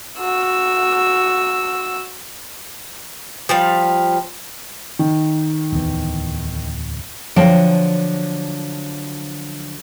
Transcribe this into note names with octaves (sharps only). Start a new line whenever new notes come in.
F#4 E6
F3 G3 F5
D#3
D1 E2
D3 F3 F#3 G5 A5